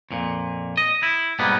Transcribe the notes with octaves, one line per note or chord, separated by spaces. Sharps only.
F2 A#2
D#5
E4
G#2 B2 G3 A#3 B3